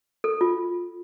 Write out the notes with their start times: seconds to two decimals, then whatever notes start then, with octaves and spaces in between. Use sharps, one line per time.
0.24 A4
0.41 F4